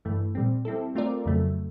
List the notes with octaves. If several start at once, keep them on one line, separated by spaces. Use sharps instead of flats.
G2 E3 A3
A#2 G3 C4
G3 C4 E4 A4
A3 C4 F4 A#4 D5
F2 C#3 F#3 A3